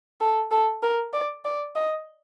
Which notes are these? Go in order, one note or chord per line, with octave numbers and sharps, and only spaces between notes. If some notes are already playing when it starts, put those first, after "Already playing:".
A4
A4
A#4
D5
D5
D#5